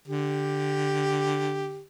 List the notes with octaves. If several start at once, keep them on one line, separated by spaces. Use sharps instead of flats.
D3 G4